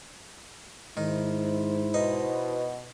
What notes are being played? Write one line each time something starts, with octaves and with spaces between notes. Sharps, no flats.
G#2 D#3 E4 C5
B2 D#4